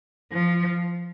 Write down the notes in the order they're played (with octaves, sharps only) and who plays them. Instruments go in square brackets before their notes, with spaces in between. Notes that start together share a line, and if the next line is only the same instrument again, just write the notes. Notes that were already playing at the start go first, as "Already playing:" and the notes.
[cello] F3